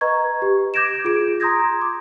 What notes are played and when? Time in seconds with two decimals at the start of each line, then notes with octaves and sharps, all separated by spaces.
0.01 B4 D#5 A#5 C#6 G#6
0.42 G4
0.74 D6 G6 G#6 A#6 D7 E7
1.05 F4 G#4 D7
1.40 A#5 C6 D#6 G6 G#6 A#6
1.82 D6